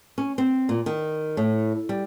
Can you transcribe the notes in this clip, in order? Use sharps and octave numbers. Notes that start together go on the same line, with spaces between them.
C#4
C4
A#2
D#3
A2
G3